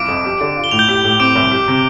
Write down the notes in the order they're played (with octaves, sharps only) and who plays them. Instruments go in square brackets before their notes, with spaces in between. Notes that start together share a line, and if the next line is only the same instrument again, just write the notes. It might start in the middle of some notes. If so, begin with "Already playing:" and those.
Already playing: [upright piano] C2 F4 [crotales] D6 D7
[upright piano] F2
G4
D3
F4
[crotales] G7
[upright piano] A2 [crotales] F7
[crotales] G6 G7
[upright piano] G4
A2
[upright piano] C4 [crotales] D6 D7
[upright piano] C2
G4
C3